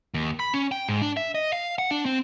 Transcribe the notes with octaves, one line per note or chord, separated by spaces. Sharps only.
D#2
B5
C#4
G5
G#2
D4
E5
D#5
F5
F#5
D4
C4